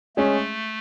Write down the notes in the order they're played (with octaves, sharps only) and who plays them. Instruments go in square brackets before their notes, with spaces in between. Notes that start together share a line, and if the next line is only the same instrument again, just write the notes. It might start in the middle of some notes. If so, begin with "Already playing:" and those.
[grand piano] G#3 C#4 G#4 [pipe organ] A3